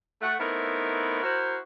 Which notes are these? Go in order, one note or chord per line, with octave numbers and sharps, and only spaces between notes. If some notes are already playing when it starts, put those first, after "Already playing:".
A3 F#5
A3 B3 C4 D#4 E4 A#4
E4 F#4 A#4 C5